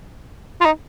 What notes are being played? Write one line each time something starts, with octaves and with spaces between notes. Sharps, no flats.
F4
D#4